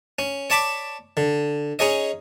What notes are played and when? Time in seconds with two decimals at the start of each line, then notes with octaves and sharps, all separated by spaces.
0.19 C#4
0.50 C#5 D5 A5 B5 D6
1.17 D3
1.79 C#4 D#4 G#4 C#5 D#5